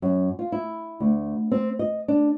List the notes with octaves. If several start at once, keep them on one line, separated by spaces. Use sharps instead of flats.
F#2
F4
E4
D2
C4
D#5
D4